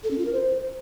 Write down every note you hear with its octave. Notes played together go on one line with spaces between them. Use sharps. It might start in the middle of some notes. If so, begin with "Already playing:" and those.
A4
C#4
F4
A#4
C5